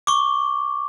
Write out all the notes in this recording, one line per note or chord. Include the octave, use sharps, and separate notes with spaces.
C#6 D6